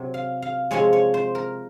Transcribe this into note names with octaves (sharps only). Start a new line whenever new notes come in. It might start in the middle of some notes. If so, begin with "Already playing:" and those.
Already playing: C3 F#3
F5
F5
C3 F3 G#3 C#5
C#5
C5
A#4